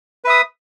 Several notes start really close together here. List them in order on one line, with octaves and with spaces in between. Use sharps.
B4 E5 D#6